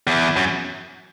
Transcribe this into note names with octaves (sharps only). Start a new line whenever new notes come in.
E2
F#2